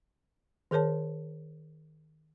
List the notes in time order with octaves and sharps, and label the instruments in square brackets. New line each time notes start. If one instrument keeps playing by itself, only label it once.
[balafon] D#3 G#4 A#4 C#5 A5